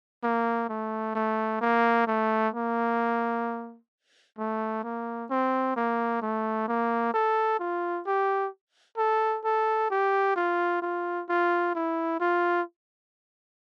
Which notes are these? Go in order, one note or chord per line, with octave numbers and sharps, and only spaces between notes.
A#3
A3
A3
A#3
A3
A#3
A3
A#3
C4
A#3
A3
A#3
A4
F4
G4
A4
A4
G4
F4
F4
F4
E4
F4